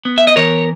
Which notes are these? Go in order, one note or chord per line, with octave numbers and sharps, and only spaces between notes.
B3
E5
D#5
E3 A#4 C#5